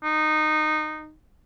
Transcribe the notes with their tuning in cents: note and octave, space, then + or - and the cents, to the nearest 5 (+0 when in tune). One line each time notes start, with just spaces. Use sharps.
D#4 -15